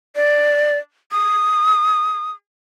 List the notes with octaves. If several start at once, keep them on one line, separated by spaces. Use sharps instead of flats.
D5
D#6